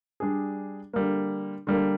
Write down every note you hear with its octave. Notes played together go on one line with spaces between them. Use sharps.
G3 D4 G#4
D3 G3 A#3
D3 G3 A#3